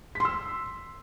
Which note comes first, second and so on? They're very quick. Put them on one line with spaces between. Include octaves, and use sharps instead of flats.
B6 C6 E6